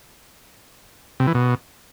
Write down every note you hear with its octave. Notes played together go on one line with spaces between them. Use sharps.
C3
E3
B2